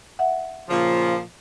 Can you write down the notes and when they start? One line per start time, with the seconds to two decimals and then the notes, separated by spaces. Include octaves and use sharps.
0.19 E5 F#5
0.69 A#2 C#3 F3